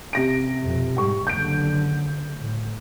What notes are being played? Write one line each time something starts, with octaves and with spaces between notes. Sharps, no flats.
C3 A#6 D7
F2 B2
G#2 G3 G4 C#6
F#1 D#2 D3 G6 D7
A2